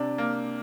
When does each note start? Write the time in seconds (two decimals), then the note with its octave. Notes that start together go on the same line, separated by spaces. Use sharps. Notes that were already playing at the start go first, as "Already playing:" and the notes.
Already playing: C3 D4
0.18 A#3